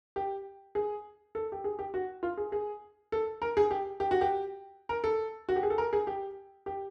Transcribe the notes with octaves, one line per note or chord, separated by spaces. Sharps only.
G4
G#4
A4
G4
G#4
G4
F#4
F4
G#4
G#4
A4
A#4
G#4
G4
G4
F#4
G4
A#4
A4
F#4
G4
G#4
A4
A#4
G#4
G4
G4